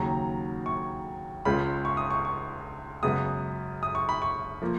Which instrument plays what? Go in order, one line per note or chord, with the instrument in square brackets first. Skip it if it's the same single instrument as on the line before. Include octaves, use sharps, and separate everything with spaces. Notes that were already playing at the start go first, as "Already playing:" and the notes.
Already playing: [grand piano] D#2 C#3 F#3 A#5
C#6
C#2 C#3 G#3 C#4 F4 B5
C#6
D#6
C#6
C#6
F#2 C#3 G#3 B3 D#6
D#6
C#6
B5
C#6
F3 A#3